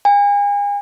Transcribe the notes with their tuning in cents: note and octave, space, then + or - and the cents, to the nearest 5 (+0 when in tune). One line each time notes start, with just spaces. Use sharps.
G#5 -40